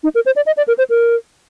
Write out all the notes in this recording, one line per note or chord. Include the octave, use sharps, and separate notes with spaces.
D#4
A#4
C5
D5
D#5
D5
A#4
C5
A#4